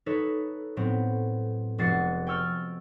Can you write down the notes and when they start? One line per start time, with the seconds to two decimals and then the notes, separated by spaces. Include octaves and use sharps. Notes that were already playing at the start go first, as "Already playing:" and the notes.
0.06 D#4 A4 B4 C#5
0.76 A2 F#3 B3 C4
1.78 F1 G#3 F#4 A6 C7 C#7
2.27 G5 G#5 C#6 E6 F6 A6